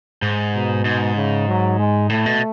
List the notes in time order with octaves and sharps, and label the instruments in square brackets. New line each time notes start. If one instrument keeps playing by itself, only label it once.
[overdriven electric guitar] G#2
[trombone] B2
[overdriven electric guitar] G#2
[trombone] C#3
F#3
G#3
[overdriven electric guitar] A2 [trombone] A3
[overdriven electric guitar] B2